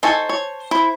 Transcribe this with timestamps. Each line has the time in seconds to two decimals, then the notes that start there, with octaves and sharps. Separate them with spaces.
0.03 D#4 A4 C5 G#5 A5 C#6
0.29 C#5
0.71 E4 C5